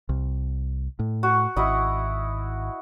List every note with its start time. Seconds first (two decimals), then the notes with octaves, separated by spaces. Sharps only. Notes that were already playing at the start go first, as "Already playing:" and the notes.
0.09 C2
0.99 A2
1.23 F#4
1.56 G#1 E4 F#4 D#5